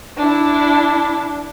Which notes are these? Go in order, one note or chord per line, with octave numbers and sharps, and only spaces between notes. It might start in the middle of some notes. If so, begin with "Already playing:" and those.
D4 E4